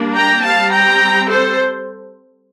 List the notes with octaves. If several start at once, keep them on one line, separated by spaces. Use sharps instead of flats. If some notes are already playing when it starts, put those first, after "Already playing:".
Already playing: G3 A#3 D4
G5 A#5
G3 C4 F5 A5
G5 A#5
A4 C5